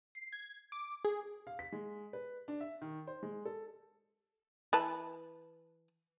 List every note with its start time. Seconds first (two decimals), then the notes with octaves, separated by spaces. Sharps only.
0.15 C7
0.32 G#6
0.72 D6
1.05 G#4
1.47 F5
1.59 B6
1.72 G#3
2.13 B4
2.48 D4
2.61 E5
2.82 D#3
3.07 C5
3.23 G#3
3.45 A4
4.73 E3 B4 A5